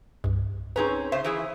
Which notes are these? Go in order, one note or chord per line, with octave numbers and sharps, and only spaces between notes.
C2 G2
C4 C#4 D#4 G#4 B4 A#5
C#3 C5 E5
E3 E4 G#4